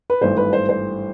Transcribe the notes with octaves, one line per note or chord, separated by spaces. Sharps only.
B4
G#1 G2 E3 A3 C5
B4
C5
C5